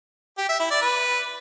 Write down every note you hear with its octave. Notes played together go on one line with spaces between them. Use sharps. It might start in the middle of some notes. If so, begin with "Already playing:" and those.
G4
E5
E4
D5
B4